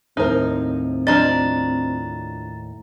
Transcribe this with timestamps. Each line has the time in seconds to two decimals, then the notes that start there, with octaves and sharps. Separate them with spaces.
0.17 D#2 A2 C4 D#4 A#4 C5
1.07 F3 D4 D#5 A#5 A6